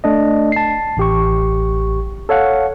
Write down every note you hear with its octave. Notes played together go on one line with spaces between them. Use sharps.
A3 D4 D#5
A5 C7
A1 G4 C#6
A4 C#5 F5 F#5